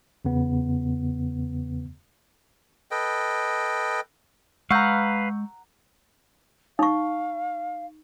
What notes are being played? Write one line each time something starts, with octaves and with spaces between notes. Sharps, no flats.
E2 C#3 B3
A4 B4 D#5 G5
G#3 B4 F5 F#5 A#5 C#6 E6 G6
D#4 F5 C#6